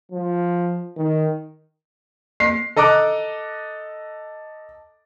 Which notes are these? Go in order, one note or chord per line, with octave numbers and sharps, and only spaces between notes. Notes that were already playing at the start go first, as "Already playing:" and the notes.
F3
D#3
A#3 C7
A4 D#5 A#5 D6 F#6